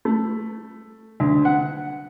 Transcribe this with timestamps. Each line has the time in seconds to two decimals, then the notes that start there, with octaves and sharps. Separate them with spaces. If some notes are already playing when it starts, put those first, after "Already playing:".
0.05 A3
1.20 D2
1.45 F#5